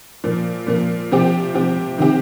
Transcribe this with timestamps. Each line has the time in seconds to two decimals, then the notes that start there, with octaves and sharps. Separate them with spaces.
0.24 A#2 F3 A#3
0.67 A#2 F3 A#3
1.11 C3 F3 C4 G4
1.54 C3 F3 C4 G4
1.98 C3 D#3 C4 G4